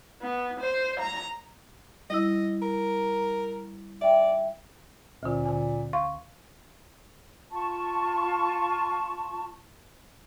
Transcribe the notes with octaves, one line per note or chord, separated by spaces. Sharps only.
B3
C5
A#5
G3 E4 D#5 E6
A#4
D5 E5 G5
D2 A#2 D3
D3 G#5
F5 C6 C#6
F4 A5 C#6